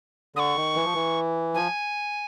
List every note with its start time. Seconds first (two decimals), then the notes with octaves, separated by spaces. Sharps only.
0.36 D3 D#6
0.40 C#6
0.56 D#3
0.76 E3
0.84 F3
0.94 E3
1.54 F3 G#5